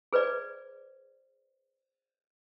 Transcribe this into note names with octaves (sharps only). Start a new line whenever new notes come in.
G#4 B4 C5 D5